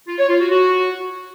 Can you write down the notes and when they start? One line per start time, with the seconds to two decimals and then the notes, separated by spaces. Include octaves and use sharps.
0.07 F4
0.18 C#5
0.29 F4
0.40 F#4
0.51 F#4